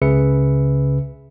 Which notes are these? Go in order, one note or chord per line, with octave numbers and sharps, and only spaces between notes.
C#2 C#3 G#4 B4 E5 C#7